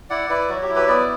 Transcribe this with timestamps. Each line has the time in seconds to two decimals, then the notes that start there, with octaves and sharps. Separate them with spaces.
0.10 E4 D5 F#5
0.30 E4 B4 D5
0.49 F#3 F#4
0.62 G4
0.69 E4
0.76 G4 B4
0.88 B3 B4 D5